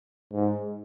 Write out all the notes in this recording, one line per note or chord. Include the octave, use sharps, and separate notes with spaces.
G#2